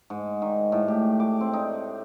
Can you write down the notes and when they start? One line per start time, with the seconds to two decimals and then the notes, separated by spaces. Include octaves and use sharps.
0.10 G#2
0.42 D#3
0.72 A2
0.88 G4
1.20 D6
1.41 C4
1.53 D#4